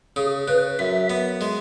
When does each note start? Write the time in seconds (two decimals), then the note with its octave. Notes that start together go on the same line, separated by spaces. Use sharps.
0.16 C#3 G#4
0.48 C#3 B4
0.79 F#2 E5
1.10 B3
1.41 G#3